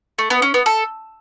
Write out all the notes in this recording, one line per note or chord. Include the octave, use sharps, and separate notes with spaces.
A3
B3
C#4
B3
A4